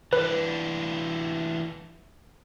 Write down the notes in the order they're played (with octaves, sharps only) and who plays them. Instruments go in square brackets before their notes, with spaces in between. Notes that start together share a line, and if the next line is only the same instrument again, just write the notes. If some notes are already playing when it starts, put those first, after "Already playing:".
[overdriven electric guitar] E3 D4 [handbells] B4